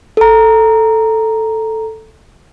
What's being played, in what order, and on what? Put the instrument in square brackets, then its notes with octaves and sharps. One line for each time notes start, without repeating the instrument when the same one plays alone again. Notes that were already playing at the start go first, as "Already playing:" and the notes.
[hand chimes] A4 A#5